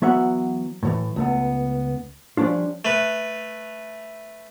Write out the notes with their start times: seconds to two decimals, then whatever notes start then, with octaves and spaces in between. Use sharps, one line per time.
0.02 E3 F#3 B3 E5 F#5
0.83 A2 C3 E3
1.16 C#2 A3 B3
2.37 F3 G3 C#4 D4 F4
2.85 A3 B4